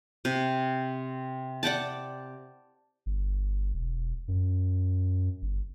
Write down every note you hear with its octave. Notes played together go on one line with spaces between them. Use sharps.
C3
D5 F#5 G5 A5
G1
E1
F#2
G1